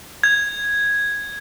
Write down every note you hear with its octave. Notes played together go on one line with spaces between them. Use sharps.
G#6